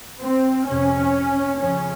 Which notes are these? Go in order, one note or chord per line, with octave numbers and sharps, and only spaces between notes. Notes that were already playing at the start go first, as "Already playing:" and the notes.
C4
F2 C3 C#4
F2 C#3 C#4